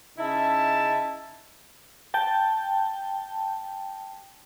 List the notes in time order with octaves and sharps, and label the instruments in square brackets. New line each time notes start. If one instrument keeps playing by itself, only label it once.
[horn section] C#3 D#4 E4 E5 A5
[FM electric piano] G5 A5